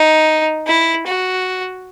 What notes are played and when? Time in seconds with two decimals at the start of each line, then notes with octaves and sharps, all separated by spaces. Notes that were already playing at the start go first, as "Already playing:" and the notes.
Already playing: D#4
0.67 E4
1.07 F#4